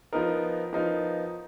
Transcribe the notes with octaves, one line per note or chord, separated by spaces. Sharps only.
F3 B3 D#4 A#4
F3 B3 D#4 A#4